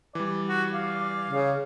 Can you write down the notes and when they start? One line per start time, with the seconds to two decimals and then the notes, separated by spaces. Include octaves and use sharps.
0.15 E3 G3 D5
0.49 F#4
0.74 F5
1.30 C#3